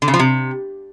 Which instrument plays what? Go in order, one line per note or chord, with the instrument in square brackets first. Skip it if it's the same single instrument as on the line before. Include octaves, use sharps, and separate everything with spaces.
[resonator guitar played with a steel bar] D3
C#3
F3
C3